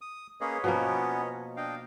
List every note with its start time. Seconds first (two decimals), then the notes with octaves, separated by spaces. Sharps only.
0.01 D#6
0.41 A#3 C#4 G#4 B4 C#5 D#5
0.64 B2 F3 A#3 B3 C#4
1.57 D4 D#5 F5 G5